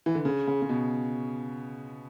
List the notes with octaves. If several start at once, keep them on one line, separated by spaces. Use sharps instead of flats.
E3
D3
C#3
C#3
C#3
B2